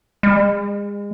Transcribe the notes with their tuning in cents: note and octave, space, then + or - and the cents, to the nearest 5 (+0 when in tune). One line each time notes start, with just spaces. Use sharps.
G#3 -35